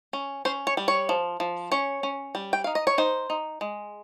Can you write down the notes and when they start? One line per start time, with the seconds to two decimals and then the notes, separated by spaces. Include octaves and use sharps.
0.13 C#4
0.45 C#4 C5
0.67 C#5
0.77 G3
0.88 C#5
1.09 F3
1.40 F3
1.72 C#4 C#5
2.03 C#4
2.35 G3
2.53 G5
2.64 D#4 F5
2.75 D#5
2.87 C#5
2.98 D#4 C5
3.30 D#4
3.61 G#3